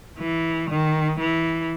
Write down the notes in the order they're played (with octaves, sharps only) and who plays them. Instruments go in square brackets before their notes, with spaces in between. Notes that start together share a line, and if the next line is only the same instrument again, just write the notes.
[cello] E3
D#3
E3